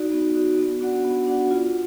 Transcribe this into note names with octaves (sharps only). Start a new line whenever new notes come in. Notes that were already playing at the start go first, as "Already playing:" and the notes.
Already playing: D#4 F#4 D5
B3
D#4 F#4 D5
B3
D4 F#4 D5 F#5
B3
D4 F#4 D5 F#5
F4